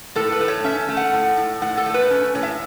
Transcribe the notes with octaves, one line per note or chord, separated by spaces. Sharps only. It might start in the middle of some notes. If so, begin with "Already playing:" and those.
A2 A4
B4
A3
C#5
C#4 E5
A3
F#5
A2
A2
A2 F#5
A4
A3
B4
C#4
A2 C#5
E5